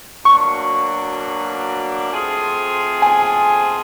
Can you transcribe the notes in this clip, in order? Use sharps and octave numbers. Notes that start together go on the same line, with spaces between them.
B2 F#3 A#3 D4 C#6
F3 A3 C4 F4 G#4
G#5